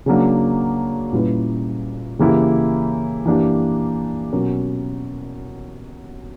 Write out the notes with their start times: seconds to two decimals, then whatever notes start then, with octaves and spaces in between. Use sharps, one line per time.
0.06 C#3 F#3 A#3 D4
1.13 A#2 G3 C#4 E4 B4
2.19 C#3 E3 A#3 E4 G4
3.26 E3 A#3 D4 G4
4.32 B2 F#3 C#4 F#4 A#4